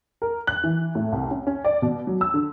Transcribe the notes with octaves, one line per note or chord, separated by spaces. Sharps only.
A#4
F#6
E3
A2
C2
C#4
C#4
D5
B2
F#3
E6
D3